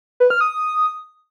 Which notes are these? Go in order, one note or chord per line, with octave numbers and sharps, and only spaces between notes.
B4
F6
D#6